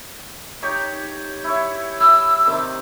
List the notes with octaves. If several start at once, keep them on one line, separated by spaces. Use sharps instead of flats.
D#4 G4 C#5
E4 C#5
E4 E6
C3 D#3 D6